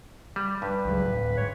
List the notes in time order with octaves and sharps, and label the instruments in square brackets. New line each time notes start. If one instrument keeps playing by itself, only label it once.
[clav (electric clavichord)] G3
[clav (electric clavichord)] G2 [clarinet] B4
[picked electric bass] C#2 F#3 G#3
D1
[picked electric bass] G#2 [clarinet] C#5